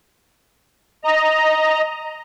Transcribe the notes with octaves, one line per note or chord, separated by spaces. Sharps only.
D#5 A#5